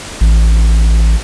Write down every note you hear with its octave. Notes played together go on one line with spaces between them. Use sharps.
A1